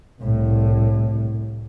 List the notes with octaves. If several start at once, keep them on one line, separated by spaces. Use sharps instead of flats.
C2 A2